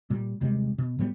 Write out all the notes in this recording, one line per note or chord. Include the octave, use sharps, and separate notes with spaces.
A#2 G3
D#2 C3 G3 G#3
B2
A2 F#3 G3 B3